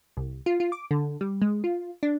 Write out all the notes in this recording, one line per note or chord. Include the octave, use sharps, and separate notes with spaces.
C2
F4
F4
D6
D3
G3
G#3
F4
D4